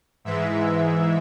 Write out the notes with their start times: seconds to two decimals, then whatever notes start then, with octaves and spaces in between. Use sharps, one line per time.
0.25 G#2 E3 G#3 E5